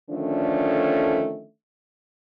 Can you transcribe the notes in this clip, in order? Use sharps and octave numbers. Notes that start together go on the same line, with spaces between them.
D3 D#3 F3 A3 C#4 D4